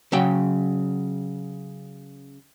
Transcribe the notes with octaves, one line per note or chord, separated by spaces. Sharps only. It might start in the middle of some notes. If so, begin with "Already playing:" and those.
C#3 F#3 G5